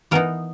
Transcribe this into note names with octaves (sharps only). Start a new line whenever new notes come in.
E3 B3 D#4 A#4